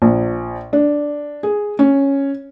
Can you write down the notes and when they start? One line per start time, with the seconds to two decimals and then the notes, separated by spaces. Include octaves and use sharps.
0.02 A#1
0.73 D4
1.43 G#4
1.79 C#4